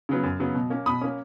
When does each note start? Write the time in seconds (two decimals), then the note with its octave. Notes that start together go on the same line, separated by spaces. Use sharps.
0.09 C#3 F#3 B3
0.23 F#2
0.40 C#3 F#3 B3
0.55 B2
0.70 A#3 C#4
0.86 B2 B5 D#6
1.01 A#3 C#4